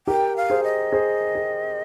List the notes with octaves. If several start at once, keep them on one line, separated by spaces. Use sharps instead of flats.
G4 A#4 G5
F5
G#4 C5
D#5
G#4 C5
G#4